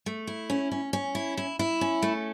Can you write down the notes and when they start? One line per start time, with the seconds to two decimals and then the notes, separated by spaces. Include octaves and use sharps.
0.06 A3
0.27 E4
0.50 C#4
0.72 C#4
0.93 C#4
1.15 E4
1.37 E4
1.59 E4
1.81 C#4
2.02 A3